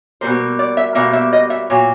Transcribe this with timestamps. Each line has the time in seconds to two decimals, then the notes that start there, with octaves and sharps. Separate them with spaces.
0.21 B2 G3 A#3 C5
0.59 D5
0.77 E5
0.95 B2 G3 A#3 E5
1.13 E5
1.33 D#5
1.50 E5
1.70 A#2 F#3